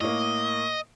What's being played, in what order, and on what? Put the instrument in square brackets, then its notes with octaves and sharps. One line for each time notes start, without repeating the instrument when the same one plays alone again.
[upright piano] A2 A#3 [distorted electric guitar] D#5